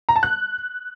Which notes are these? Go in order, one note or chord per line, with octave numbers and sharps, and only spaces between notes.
A#5
A5
F#6